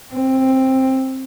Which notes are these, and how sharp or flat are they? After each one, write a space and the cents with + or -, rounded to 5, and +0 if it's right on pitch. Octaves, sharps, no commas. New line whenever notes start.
C4 +10